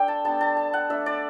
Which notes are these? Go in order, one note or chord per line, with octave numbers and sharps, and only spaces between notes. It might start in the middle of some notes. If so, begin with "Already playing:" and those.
Already playing: D4 A4 G5
A5
G3 B3 D4 A5
A5
A5
F#5
A3 D4 E5
D5